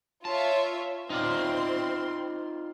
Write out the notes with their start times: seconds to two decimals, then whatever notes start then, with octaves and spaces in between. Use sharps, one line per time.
0.25 F4 C#5 E5 A5
1.10 C4 D#4 F4 D5 C6